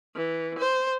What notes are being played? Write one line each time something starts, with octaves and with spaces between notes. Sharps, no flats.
E3
C5